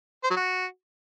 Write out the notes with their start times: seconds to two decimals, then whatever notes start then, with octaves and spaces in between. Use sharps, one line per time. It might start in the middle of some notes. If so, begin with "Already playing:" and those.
0.24 C5
0.30 F#3
0.37 F#4